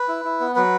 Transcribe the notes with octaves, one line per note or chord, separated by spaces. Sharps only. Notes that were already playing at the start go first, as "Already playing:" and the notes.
Already playing: B4
E4
E4
B3
F#3 B4